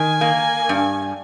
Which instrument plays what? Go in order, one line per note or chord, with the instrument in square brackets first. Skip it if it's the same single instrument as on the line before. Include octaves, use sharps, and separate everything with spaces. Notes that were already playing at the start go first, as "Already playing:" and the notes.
Already playing: [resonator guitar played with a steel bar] D#3 [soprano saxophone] G#5
[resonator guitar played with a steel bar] A#3
G2